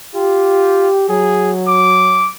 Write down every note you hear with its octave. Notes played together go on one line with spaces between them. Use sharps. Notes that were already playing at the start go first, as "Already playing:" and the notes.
F4 G4
F#3 G#4
D6